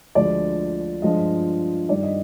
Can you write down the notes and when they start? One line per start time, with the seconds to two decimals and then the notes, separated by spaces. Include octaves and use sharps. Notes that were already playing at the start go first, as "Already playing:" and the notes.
0.15 D2 D3 F3 G#3 D5
1.02 G2 F3 G#3 D#5
1.89 G2 D#3 G3 D5
2.03 D#5